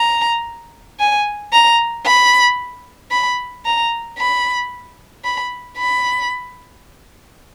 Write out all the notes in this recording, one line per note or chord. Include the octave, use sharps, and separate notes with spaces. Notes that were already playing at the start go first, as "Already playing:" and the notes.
Already playing: A#5
G#5
A#5
B5
B5
A#5
B5
B5
B5